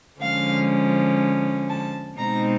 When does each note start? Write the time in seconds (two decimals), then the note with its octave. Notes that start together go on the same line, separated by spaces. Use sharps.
0.21 D3 F3 G#3 C#4 F5
1.69 A5
2.18 B2 G#3 C4 D#4 A#5